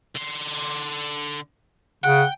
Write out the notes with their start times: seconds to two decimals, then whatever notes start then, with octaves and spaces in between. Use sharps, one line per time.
0.15 D3 C6
2.04 C#3 F#5 G5